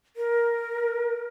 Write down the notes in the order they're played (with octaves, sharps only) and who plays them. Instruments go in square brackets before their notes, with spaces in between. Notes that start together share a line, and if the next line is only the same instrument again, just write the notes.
[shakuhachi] A#4